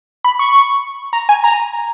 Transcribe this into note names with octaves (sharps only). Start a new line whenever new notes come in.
B5
C#6
A#5
G#5
A#5